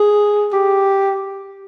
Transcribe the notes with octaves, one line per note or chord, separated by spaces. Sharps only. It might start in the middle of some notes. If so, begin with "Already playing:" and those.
Already playing: G#4
G4